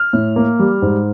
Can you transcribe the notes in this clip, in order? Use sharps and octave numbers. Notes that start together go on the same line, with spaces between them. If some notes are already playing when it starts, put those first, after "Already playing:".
Already playing: F6
A2
A#3
G3
G#2